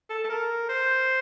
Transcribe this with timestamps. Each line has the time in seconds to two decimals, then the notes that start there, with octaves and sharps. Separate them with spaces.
0.10 A4
0.24 A4
0.29 A#4
0.69 C5